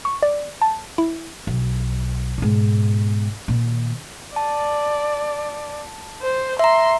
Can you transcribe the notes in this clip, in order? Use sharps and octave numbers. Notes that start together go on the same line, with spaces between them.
C#6
D5
A5
E4
B1
G#2 B2
A#2 D#3
D5 A5
C5
E5 A#5 C6